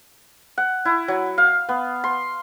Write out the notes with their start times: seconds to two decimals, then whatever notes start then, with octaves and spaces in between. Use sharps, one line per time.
0.58 F#5
0.85 E4
1.08 F#3
1.38 F5
1.69 B3
2.04 C6